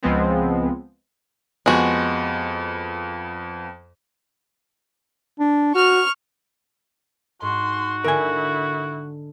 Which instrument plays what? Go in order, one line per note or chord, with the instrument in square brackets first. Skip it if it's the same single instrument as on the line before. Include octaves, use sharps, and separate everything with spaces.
[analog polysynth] C#2 F3 G#3 B3 C4
[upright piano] F2 B3 [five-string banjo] G#3 F#4
[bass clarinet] D4
[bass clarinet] F#4 [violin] C#6 F6
[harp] G#2 [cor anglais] F#4 [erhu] C6
[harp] D3 [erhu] E4 [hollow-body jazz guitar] A#4 G#5